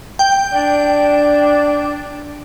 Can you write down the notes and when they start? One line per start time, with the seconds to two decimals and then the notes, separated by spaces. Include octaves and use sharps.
0.19 G5
0.53 D4